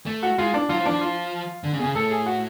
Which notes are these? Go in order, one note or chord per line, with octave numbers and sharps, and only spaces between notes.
A3
F#4
G#3 F4
D4
F#3 F4
F3
D4
F3
F4
D3
C#3
B2 C#3 G#4
A2 A4
G#4
F#4